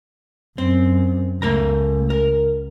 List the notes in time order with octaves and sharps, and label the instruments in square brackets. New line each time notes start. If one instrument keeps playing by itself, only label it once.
[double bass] F#2 [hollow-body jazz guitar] C4
[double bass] C#2 [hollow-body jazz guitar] A3 A#4 A#5
[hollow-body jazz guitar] A#4